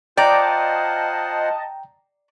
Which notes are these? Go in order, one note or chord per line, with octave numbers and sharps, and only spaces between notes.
F4 C5 D5 D#5 F#5 G5 A5 A#5